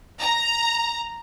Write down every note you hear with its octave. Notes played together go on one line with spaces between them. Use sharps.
A#5